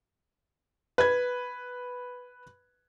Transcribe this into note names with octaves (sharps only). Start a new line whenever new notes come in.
B4 G#6